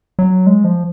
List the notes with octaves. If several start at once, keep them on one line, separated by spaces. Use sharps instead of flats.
F#3
G#3
F3